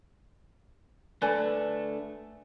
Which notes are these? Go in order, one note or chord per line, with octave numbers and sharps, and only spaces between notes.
A3 D4 A4 B4 D5 G#5